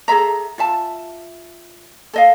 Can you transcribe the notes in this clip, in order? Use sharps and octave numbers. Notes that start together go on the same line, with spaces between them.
G#4 A4 E5 A#5
F4 E5 A5
A4 D#5 F5